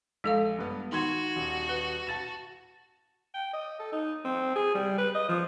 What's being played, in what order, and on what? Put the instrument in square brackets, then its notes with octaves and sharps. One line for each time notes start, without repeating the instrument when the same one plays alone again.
[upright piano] A#1 [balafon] G#3 A4 F5
[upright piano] G2 B3
[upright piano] D#3 C6 G#6 [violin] F#4
[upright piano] D#1
[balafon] B4
[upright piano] A5 A6 E7
[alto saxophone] G5
D#5
A4
D#4
C4
G#4
G3
B4
D#5
F3